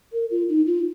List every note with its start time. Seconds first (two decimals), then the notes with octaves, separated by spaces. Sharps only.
0.13 A#4
0.31 F4
0.49 D#4
0.67 F4